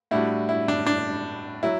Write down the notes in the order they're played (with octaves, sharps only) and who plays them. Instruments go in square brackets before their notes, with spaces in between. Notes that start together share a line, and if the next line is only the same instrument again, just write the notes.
[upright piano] A2 G3 D4 F#4 [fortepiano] E4
[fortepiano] E4
D4
D4
[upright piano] F#3 [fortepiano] E4